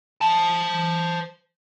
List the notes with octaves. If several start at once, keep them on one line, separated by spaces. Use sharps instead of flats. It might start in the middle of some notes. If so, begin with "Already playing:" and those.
C5 A5